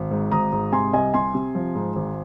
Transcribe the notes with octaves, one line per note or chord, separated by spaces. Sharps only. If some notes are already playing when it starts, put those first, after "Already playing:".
Already playing: G#1
G#2
G#1 A#5 D#6
G#2
C3 G#5 C6
C2 D#5 G#5
C3 G#5 C6
C3
F3
G#2
G#1